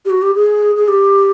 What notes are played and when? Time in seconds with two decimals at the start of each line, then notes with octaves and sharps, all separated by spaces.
0.05 G4
0.10 F#4
0.22 G4
0.35 G#4
0.76 G#4
0.88 G4